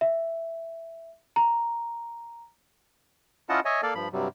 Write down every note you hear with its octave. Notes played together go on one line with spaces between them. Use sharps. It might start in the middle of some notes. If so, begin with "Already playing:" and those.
E5
A#5
C#4 E4 F4 D#5 F#5 A5
C#5 D#5 E5 G#5
A#3 A4 D5 F5
G2 F3 B5
G2 C3 F#3 G3